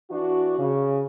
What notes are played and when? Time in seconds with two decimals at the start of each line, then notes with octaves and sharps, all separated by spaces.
0.11 E3 D4 F#4
0.58 C#3